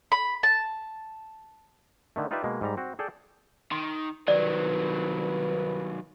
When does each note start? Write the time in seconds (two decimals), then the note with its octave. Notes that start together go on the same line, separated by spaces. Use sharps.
0.12 B5
0.43 A5
2.16 D3 D#3 A3
2.31 D#4 F4 G4 B4 D5 E5
2.44 B2 G#3 A#3
2.61 G#2 G3 A#5
2.77 C4 F#4
2.99 G#4 A4 D5 G5
3.71 D#3 C6
4.28 C2 D#3 F#3 B4 D5